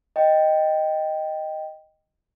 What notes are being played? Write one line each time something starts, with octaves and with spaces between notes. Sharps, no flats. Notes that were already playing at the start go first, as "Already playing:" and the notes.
D#5 G5